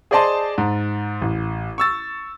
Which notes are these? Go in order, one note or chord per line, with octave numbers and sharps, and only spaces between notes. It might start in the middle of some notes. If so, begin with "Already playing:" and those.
G#4 C5 D5 D#5 A5 C6
G#2
A1
C#6 E6 A6